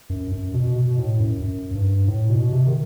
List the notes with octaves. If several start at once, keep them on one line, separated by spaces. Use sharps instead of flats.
F#2
F#2
B2
B2
A2
F#2
F#2
G2
A2
B2
C3
D#3